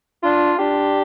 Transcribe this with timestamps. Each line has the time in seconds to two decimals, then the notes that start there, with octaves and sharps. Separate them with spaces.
0.23 D4 F4
0.59 D4 G4